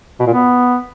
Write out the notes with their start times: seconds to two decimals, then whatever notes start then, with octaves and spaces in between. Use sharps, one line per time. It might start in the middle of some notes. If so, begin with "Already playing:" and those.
0.20 B2
0.27 A#2
0.34 B3